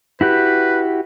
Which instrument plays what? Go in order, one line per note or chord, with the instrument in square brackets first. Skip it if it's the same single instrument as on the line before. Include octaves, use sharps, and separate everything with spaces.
[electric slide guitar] E4 F#4 G4 [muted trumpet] B4